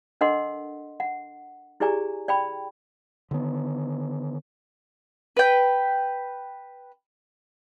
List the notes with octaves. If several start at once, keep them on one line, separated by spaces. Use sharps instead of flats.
D4 A4 A#4 D#5 F#5 C6
F#5
E4 G4 G#4 D5 G#5 A#5
D5 G5 B5
D3 D#3 B3
B4 G5